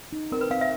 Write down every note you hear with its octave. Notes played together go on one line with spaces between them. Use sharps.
D#4
C4 A#4
B4
C4 F5
E5